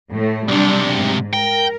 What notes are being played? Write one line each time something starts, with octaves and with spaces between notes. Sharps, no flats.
A2 A3
B1 C3 G3 D4
G#2
A#4 G5